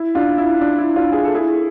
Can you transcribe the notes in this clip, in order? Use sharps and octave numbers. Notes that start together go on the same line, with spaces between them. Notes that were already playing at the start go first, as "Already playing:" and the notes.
Already playing: E4
D4 F4
E4
D4
E4
D4 F4
G#4
A4
E4 G#4